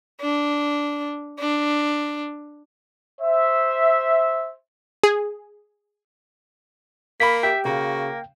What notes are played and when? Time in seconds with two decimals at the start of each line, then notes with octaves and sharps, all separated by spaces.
0.20 D4
1.39 D4
3.22 C5 E5
5.03 G#4
7.20 A#3 F5 B5 B6
7.43 G4 E5 G5
7.65 C#3 A#3 F#4